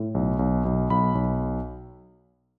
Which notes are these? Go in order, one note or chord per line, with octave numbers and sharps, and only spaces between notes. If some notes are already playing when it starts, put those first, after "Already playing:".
Already playing: A2
B1
B1
B1
B1 B5
B1